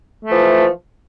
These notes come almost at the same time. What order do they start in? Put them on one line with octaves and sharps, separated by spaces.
A3 F3 E3